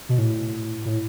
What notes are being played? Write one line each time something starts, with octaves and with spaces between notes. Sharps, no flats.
B2
A2
A2